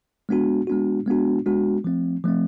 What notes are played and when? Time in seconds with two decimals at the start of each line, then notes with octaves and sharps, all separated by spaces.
0.29 G#3 B3 D4 F#4
0.67 G#3 B3 D4 F#4
1.06 G#3 B3 D4 F#4
1.46 G#3 B3 D4 F#4
1.84 F3 A3 C4
2.24 F3 A3 C4